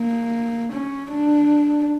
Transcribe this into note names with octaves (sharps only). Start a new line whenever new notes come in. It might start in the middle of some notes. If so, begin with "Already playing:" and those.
Already playing: A#3
C#4
D4